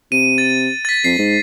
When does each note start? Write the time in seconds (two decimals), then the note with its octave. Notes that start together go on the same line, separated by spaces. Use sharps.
0.12 C3 D#7
0.38 A6
0.85 A6 B6
1.04 F2 C7
1.19 G#2